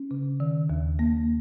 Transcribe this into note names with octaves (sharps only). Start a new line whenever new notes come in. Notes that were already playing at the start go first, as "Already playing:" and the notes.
Already playing: C#4
C#3
D#3
D#2
A#3